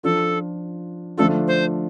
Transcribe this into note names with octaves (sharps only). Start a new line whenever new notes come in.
F3 D4 F4 A4
D3 F3 A3 D4 F4 A4
C5